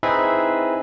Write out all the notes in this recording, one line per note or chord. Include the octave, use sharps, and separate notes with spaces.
C4 D#4 E4 G#4 B4 E5